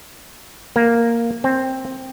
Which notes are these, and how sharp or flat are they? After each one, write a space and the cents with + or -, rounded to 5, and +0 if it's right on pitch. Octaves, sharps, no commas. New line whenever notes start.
A#3 -5
C4 +10